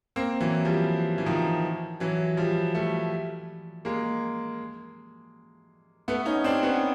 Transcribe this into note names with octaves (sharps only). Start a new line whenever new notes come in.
A#3 C4
E3 F#3
F3 G3
E3
D#3 F3
E3 F#3
F3 G3
G3 A3
G#3 A#3
A3 B3
C#4 D#4
C4 D4
B3 C#4